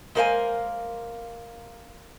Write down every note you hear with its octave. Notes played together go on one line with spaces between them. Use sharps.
G#3 A#3 A#4 C5 F5 G#5